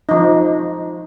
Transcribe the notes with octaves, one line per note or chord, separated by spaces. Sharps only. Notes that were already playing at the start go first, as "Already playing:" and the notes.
F3 D#4